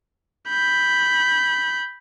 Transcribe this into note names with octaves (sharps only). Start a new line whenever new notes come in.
B5 G6